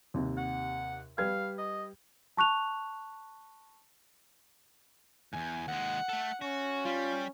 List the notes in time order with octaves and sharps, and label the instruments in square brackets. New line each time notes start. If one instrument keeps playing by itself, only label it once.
[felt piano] D#2 C3
[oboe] F#5
[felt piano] G3 B4 G#6 [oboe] F5
[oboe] D#5
[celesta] A5 C#6 F#6 F7
[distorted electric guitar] E2 G#2 [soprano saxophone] G#5
[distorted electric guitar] D#2 G#3 [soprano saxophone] F#5
[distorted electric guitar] A3 A4
[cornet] C#4 [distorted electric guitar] F#4
[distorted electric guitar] G3 [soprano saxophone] F4